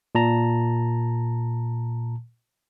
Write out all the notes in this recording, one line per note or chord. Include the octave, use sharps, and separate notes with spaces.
A#2 A5 A#5